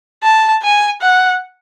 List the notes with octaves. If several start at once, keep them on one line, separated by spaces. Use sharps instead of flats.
A5
G#5
F#5